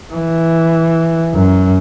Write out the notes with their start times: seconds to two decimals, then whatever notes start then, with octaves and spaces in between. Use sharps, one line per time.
0.14 E3
1.34 F#2